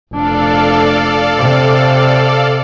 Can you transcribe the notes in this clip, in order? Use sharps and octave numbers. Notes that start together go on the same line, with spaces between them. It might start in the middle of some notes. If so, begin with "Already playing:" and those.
F1 D4 A4 D5 F5
C3